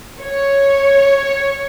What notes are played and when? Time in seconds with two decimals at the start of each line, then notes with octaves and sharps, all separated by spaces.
0.22 C#5